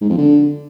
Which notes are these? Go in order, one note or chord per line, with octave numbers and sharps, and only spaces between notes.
G#2
F2
D3